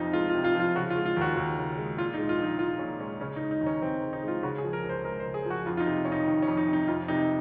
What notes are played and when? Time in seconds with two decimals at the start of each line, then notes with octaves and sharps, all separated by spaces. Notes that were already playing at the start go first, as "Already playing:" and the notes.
Already playing: F2 C3 F3 D#4 F4
0.13 G#3 F4
0.29 F4
0.34 C3
0.44 F4
0.55 F3
0.60 F4
0.75 C#3 F#4
0.90 F4
0.96 G#3
1.05 F4
1.17 D#2 F#4
1.37 D#2
1.57 C#3
1.77 G#3
1.97 A#2 F4
2.14 D#4
2.18 G#3
2.29 F4
2.38 A#1
2.44 D#4
2.59 A#1 F4
2.79 A#2 C#4
2.99 G#3 C#4
3.20 C#3 C#4
3.36 D#4
3.40 G#3
3.51 D#4
3.61 D#2
3.66 C#4
3.82 D#2 C4
4.02 C#3
4.13 D#4
4.22 G#3
4.28 F4
4.43 C#3 F#4
4.58 G#4
4.64 F3
4.73 A#4
4.84 C#2
4.89 C5
5.04 G#3 A#4
5.20 C5
5.25 C#3
5.34 G#4
5.46 F3 F#4
5.66 F2 F4
5.77 F4
5.80 D#4
5.86 C3
6.05 F1 C#4
6.12 D#4
6.27 D#3
6.42 C#4
6.47 F2
6.57 D#4
6.68 C3 D#4
6.88 F2 F4
7.08 C3 D#4